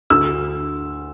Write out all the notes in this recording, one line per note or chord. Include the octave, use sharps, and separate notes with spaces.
D2 E6